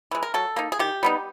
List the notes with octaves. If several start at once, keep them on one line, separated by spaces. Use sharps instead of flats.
E3 G#3
A#4
F#3 A4
A#3 D#4
G#4
D#3 G4
G3 B3 D#4